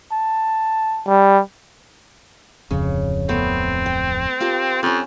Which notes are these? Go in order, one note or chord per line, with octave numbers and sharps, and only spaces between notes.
A5
G3
D1 F2 C#3
A3 B3 C4
G5
F4 G4 A#4
F2 C4 C#4